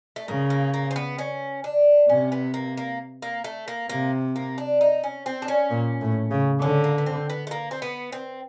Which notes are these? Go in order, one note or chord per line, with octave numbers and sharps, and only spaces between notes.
A3
C#3 A#3
A#3
A#3
C4
B3
C#4
D4
C3 C#4
B3
A#3
A#3
A#3
A3
A#3
C3 A#3
A#3
D4
D#4
C#4
C4
D4
C#4
A#2
A2
C#3
D3 C#4
A#3
B3
C4
B3
A3
A#3
C4
B3
C4